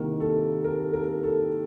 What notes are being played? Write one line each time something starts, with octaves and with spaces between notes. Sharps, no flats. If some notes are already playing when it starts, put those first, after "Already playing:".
Already playing: C2 C3 D#3 A#3 A#4
A4
A#4
A#4
A4